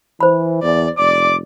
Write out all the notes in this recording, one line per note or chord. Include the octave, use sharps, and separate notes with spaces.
E3 C5 B5
E2 D5
F1 D5 D6